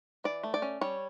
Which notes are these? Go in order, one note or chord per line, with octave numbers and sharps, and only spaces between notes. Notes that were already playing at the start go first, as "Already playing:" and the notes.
E3 D5
A3
D5
C#4
G3 C#5